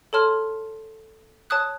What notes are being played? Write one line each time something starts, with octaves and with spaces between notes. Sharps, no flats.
A4 C#5 A5 C6 F6
C#5 A5 D#6 F#6